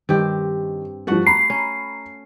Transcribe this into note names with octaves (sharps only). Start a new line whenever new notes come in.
G2 D#3 C4 G4
G2 F3 A3 F#4 F#5
A#5 B5 C7
C#4